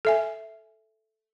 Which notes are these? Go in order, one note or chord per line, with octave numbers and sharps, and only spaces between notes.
A4 E5 G#5